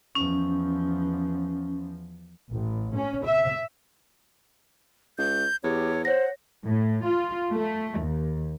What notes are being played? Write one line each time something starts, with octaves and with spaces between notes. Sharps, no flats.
E2 F3 C#4
A1
C#4
E5
C#2 G6
E2 G4 C#5
C5 C#5 F#5 A#6
A2
F4
A3
D#2